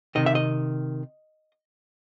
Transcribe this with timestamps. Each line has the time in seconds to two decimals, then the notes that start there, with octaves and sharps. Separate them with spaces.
0.15 C3 D#3 D#5
0.26 E5
0.35 D#5